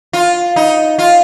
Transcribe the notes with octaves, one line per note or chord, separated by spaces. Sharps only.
F4
D#4
F4